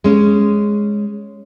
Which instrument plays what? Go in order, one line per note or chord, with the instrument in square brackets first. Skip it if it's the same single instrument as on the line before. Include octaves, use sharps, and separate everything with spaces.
[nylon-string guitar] G#3 C#4